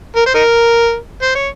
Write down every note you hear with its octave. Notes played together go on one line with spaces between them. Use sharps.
A#4
C5
D#4 A#4
C5
C#5